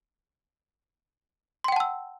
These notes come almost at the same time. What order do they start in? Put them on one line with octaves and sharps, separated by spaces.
C6 G5 F#5 A5 E6